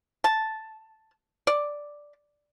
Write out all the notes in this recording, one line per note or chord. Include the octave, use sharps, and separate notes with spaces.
A5
D5